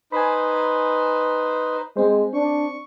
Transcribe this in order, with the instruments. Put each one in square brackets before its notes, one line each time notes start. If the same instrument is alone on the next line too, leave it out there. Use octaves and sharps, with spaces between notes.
[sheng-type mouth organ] D#4 B4 C5 [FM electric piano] G#5 B5
[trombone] G#3 [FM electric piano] C4 C5
[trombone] D4 [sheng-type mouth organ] C#6